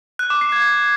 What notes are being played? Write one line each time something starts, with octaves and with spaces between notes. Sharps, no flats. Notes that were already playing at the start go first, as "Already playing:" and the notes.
F#6
D6
C7
G#6